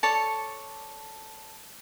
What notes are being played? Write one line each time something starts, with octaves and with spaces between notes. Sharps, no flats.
A4 C#5 D5 A5